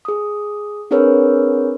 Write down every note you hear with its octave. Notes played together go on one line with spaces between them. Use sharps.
G#4 D#6
C4 D4 G#4 A#4 B4 C#5